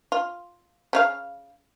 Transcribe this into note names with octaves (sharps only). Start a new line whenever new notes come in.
F4
C#3 D#4 F5